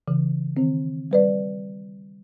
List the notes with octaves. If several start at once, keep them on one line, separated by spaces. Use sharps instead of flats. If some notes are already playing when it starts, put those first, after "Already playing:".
C#3 E3
D#3 C4
G3 B4 D5